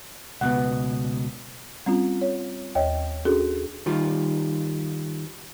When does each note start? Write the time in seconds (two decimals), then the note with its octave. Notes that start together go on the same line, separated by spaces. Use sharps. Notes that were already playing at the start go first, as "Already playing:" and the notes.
0.41 C#2 B2 B3 F#5
1.86 G3 C4 C#4 F4
2.21 C#5
2.75 D#2 C#5 D#5 G5
3.25 C#4 D4 F#4 G#4 A4
3.86 D#3 G3 F4